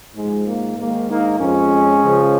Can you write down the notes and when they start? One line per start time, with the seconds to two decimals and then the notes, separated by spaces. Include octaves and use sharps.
0.15 G#2 F3 G#3
0.46 A#3
0.77 G#2 D#3 A#3
1.09 A#3 D#4
1.40 F2 F3 G#3 C#4
2.02 C#2 C#3 F3